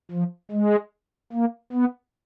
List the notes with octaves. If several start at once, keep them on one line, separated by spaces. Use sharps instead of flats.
F3
G#3
A#3
B3